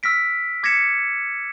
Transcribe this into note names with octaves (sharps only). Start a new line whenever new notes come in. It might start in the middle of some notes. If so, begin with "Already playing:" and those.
E6 F6 A#6 B6 D7
D6 G#6 A#6 B6 C#7 E7